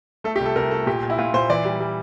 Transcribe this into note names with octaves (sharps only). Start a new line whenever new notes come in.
A3 A4
G4
C2
A4
C2 A#4
A3 A4
A#2 G4
A#2
E4
A#2 F4
A#2 C5
E3 D5
G3
G3